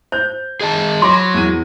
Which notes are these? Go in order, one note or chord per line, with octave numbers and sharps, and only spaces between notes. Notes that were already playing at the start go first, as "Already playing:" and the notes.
C5 G6
G#4 D#5 A5
F#3 B5 C6 D6 A#6
E2 D#7